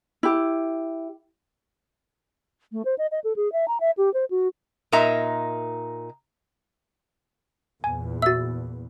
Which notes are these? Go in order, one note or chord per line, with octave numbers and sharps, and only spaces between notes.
E4 G4
A3
C5
D#5
D#5
A4
G#4
E5
A#5
E5
G4
C5
F#4
A#2 D#4 A#4 E5 A#5
E2 A#2 G#5
F#4 E5 E6 A6